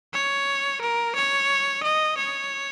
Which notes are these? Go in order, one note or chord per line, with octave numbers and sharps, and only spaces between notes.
C#5
A#4
C#5
D#5
C#5